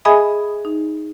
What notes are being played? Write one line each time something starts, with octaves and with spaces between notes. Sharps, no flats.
G#4 D#5 E5 G#5 B5 D#6
D#4